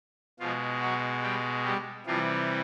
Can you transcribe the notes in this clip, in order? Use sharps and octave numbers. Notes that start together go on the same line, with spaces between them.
B2 F3 G#3 F4
F#3 F#4
G3 G4
G3 G4
C3 E3 F3 G3 F4